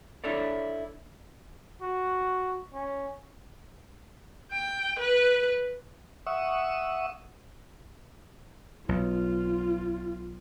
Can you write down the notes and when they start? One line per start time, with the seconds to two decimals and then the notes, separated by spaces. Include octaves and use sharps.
0.24 D4 E4 A4 C#5 D5
1.82 F#4
2.74 C#4
4.52 G5
4.99 B4
6.27 E5 F#5 C#6 D#6 E6
8.89 B1 F4